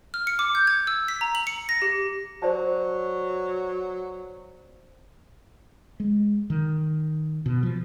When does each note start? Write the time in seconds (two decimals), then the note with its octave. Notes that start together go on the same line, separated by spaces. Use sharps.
0.14 F6
0.27 C#7
0.39 D6
0.55 G6
0.67 G#6
0.87 E6
1.08 B6
1.21 A#5
1.35 F#7
1.47 C#7
1.69 A#6
1.82 G4
2.42 F#3 C5 D5 A5
6.00 G#3
6.50 D#3
7.46 B2
7.63 F3